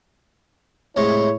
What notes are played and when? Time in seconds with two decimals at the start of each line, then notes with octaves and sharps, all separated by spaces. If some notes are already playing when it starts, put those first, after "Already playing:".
0.96 A2 C3 G#3 E4 C#5